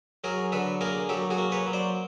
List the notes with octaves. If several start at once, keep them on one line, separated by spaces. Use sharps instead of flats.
F#3 G#4 A#4
D3 A4 B4
A#3 G#4 A#4
F#3 G4 A4
F#4 G#4
A#3
B4 C#5
F#3
C5 D5